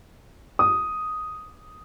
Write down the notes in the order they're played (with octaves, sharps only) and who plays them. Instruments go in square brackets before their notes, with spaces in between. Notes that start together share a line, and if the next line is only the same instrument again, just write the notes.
[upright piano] D#6